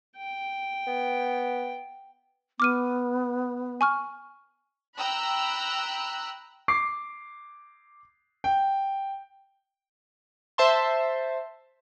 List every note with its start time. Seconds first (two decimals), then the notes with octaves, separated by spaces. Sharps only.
0.17 G5
0.87 B3
2.60 B3 D6 F6 D#7
3.81 G#5 C#6 F6
4.97 G5 A#5 B5 E6 F#6
6.68 D6 C7
8.44 G5
10.58 C5 E5 A5 C6